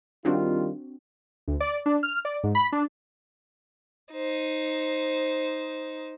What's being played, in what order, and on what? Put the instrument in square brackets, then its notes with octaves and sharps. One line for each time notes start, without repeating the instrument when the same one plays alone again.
[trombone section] D#3 G3 F4 [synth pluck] C4 D4 F#4
[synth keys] D2
D5
D4
F6
D5
G#2
B5
D4
[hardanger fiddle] D#4 C5